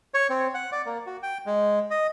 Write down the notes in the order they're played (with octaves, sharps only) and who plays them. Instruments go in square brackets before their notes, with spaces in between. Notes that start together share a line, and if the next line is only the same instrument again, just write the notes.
[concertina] C#5
C4
F#5
D5
A#3
F#4
G5
G#3
D#5